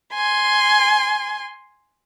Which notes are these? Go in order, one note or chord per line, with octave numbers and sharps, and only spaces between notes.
G#5 C6